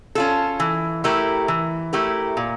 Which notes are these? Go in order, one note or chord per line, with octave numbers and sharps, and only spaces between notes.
C#4 F4 A4
E3
A3 E4 G4 A#4
E3
A3 E4 G4 A#4
A#2